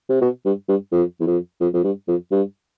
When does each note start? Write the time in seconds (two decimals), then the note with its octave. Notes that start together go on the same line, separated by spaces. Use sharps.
0.09 C3
0.21 B2
0.45 G2
0.68 G2
0.92 F2
1.20 E2
1.27 F2
1.60 F2
1.74 F2
1.84 G2
2.08 F2
2.31 G2